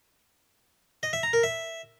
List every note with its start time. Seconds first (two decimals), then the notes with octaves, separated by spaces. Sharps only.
1.03 D#5
1.13 E5
1.23 A#5
1.33 A#4
1.43 E5